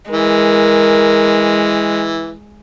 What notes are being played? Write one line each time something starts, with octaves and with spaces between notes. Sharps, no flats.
E3 G#3 A#4